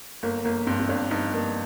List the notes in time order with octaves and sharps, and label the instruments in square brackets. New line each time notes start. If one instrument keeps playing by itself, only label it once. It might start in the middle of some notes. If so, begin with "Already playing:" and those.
[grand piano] G1 [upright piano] A#3
[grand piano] G1 [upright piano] A#3
[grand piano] G2 [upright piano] C4
[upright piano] C4
[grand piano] G1 [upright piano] D4
[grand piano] G2 [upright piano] D#4
[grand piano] G2 [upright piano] A#3